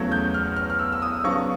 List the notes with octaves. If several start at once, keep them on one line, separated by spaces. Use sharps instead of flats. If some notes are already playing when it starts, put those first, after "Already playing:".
Already playing: E2 C#3 F#3 A3 G#6
G6
F6
F6
F6
E6
E6
D#6
C#3 F#3 B3 D4 F4 C#6